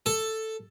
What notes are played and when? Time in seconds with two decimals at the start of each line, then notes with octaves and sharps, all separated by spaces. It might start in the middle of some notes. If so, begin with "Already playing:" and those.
0.06 A4